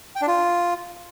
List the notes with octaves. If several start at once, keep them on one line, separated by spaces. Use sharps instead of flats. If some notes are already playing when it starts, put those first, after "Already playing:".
G5
D4
F4